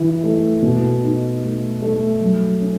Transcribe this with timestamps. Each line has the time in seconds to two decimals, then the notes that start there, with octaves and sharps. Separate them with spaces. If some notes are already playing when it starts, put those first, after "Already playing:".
Already playing: E3 E4
0.23 A3
0.62 B2
1.03 D#4
1.42 A3
1.82 A3
2.21 F#3
2.61 C#4